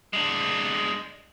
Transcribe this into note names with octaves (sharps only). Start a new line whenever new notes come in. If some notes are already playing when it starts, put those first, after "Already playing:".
G#3 D4